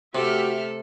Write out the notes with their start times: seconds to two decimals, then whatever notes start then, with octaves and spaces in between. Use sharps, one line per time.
0.15 C3 A3 F#4 G4 A4 E5 F6